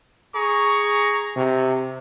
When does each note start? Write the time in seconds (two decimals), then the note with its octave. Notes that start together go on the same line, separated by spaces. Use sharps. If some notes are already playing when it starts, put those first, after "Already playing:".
0.36 G#4 A#5 C#6
1.36 C3